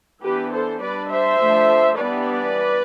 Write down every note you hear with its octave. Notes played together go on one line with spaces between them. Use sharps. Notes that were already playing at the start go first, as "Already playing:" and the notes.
E3 B3 D4 G4 B4
A4 C5
G3 D4 B4 D5
C5 E5
F3 A3 D4
E3 G3 B3 D4 B4 D5